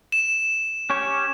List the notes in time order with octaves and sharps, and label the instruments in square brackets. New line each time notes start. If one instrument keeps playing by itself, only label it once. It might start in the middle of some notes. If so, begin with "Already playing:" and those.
[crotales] E7
[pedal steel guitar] C#4 G4 C#5